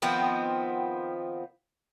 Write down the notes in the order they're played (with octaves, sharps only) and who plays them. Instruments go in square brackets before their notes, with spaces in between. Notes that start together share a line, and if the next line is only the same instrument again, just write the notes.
[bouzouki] D#3 F3 B3 C4